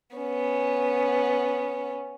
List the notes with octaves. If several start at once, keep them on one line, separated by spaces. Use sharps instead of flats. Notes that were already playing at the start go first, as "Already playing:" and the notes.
B3 C#4